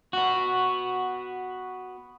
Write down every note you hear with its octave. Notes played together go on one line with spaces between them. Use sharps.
B3 F#4